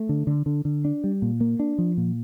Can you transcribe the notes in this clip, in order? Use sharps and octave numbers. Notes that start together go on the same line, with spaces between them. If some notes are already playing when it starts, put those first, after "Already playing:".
Already playing: A3
D3
D3
D3
D3
D4
G3
A#2
A#3
D4
F3
A#2